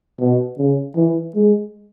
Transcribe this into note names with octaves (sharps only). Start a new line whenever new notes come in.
B2
C#3
E3
G#3